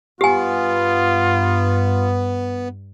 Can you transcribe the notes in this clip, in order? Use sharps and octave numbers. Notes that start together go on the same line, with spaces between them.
G2 B3 F4 G4 G#5